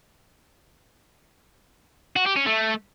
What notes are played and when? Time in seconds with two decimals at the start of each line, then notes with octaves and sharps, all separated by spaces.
2.16 F#4
2.26 G4
2.36 C#4
2.46 A3